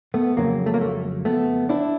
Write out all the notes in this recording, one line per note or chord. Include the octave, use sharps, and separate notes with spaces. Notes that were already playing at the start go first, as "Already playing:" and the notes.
A3 B3
F2 C#3 F#3 A#3
A3
A#3
A3
A3 B3
D4 E4